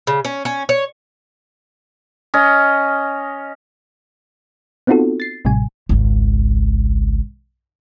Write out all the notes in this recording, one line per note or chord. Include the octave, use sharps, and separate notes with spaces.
C#3
C#4
C#4
C#5
C#4 D#5
B3 C4 D#4 F4 F#4 A4
A6 C7
A1 A2 C3 G3 G#5
G#1 C#2